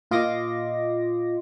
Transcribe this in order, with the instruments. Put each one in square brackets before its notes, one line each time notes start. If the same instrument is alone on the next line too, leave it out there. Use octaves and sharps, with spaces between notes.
[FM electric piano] A#2 F4 D#5 C6 D6 A#6